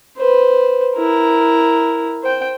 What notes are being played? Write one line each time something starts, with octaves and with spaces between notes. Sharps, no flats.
B4 C5
E4 A#4
C5 G5